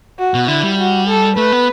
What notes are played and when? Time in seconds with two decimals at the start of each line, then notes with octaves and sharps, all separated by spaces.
0.19 F#4
0.34 B2
0.48 D3 E4
0.63 G3
0.78 F#4
1.08 A4
1.37 A3 B4
1.52 B3